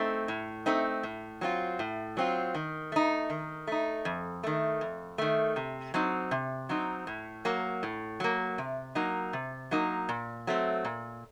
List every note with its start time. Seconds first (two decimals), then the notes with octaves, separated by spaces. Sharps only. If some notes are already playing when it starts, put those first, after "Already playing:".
Already playing: A3 C4 D#4
0.28 A2
0.66 A3 C4 D#4
1.03 A2
1.41 F#3 C4 F4
1.79 A2
2.17 F#3 C4 F4
2.54 D#3
2.92 A3 D#4
3.30 D#3
3.67 A3 D#4
4.05 F2
4.44 D#3 A3
4.81 F2
5.18 D#3 A3
5.56 C3
5.94 F#3 C4 D#4
6.31 C3
6.69 F#3 C4 D#4
7.07 A2
7.45 F#3 A#3
7.83 A2
8.20 F#3 A#3
8.58 C3
8.95 F#3 A#3 D#4
9.33 C3
9.71 F#3 A#3 D#4
10.09 A#2
10.47 F#3 A3 C4
10.85 A#2